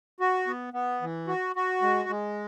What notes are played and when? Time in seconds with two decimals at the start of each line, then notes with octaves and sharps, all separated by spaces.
0.20 F#4
0.47 B3
0.74 B3
1.02 E3
1.28 F#4
1.56 F#4
1.82 G#3
2.09 G#3